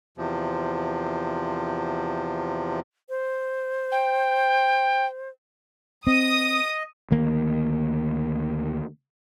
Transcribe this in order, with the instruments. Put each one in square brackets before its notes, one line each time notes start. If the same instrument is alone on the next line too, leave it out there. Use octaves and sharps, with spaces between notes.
[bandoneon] E2 C3 F3
[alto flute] C5
[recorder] G5
[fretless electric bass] C4 [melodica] D#5 [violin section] D#6
[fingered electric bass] D2 D#3 A#3